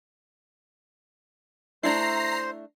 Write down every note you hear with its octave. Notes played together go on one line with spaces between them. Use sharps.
A3 D4 E4 C5 A#5 A#6 C7